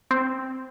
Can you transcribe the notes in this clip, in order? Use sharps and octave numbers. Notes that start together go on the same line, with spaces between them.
C4